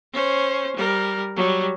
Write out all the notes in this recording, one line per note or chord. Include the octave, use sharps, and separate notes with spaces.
C#4 C5
G3 A#4
F#3 G3